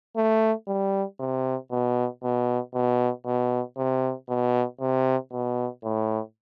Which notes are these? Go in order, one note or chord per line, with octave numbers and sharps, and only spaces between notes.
A3
G3
C3
B2
B2
B2
B2
C3
B2
C3
B2
A2